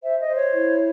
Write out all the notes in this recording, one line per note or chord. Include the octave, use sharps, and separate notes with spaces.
C5 E5
D#5
C5
C#5
E4